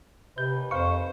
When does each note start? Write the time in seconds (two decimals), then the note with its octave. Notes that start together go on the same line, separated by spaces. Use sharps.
0.38 D#2 C3 D#4 B4 G6
0.71 F2 C5 F5 C#6